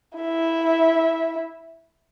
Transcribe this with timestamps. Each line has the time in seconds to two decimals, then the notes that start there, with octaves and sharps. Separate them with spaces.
0.18 E4 E5